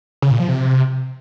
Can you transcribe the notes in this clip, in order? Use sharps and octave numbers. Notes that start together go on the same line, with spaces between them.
C#3
A#2
F3
C3